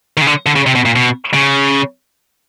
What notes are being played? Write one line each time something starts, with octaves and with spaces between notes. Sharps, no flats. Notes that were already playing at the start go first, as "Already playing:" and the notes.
D#3
C#3
D3
D3
C#3
C3
B2
A#2
B2
C#3